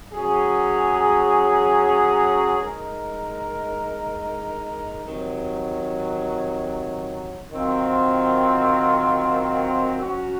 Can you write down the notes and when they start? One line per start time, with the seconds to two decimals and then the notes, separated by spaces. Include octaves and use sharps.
0.13 F#3 C#4 G#4
2.59 G#3 D#4 A#4
5.05 C3 D#3 F#3
7.52 D#3 F#3 C4 F4
9.98 F#3 C#4 F#4